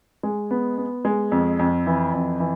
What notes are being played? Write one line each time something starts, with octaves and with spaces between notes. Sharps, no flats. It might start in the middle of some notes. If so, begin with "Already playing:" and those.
G#3
B3
B3
G#3
F2
F2
E3
F2
E3